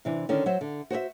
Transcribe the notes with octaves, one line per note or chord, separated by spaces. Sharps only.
C3 E3 D4
D3 D#3 C#4
F#3 C5 E5
D3
F#4 C5 D5 E5